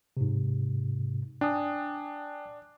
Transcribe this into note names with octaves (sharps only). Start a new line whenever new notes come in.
G#2 C3
D4 G5 G#5 D#6